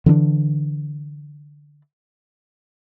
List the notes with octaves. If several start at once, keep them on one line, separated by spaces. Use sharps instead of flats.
D3 E3 G#3 D4